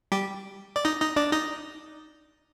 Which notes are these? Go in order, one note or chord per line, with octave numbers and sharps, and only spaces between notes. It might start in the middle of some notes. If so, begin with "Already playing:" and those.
G3 G4
D5
D#4 D#5
D#4 D#5
D4 D5
D#4 D#5